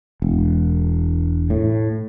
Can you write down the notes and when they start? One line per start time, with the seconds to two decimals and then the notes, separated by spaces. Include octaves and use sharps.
0.22 E1
1.50 A2